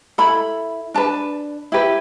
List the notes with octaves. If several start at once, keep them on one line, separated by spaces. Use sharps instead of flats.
E4 A4 B5
D4 B4 A5
E4 G4 B4